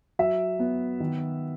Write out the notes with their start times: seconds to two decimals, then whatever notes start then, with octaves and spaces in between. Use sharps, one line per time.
0.19 F#3 E5
0.59 B3
1.00 D#3